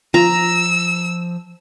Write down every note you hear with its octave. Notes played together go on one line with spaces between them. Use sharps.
F3 F4 A#5 E6